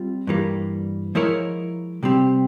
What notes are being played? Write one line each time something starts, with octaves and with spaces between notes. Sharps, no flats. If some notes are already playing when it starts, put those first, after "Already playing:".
Already playing: G3 C4 F4
G2 E3 G3 A#3
F3 G#3 E4 A#4 C#5
C3 G3 C4 G4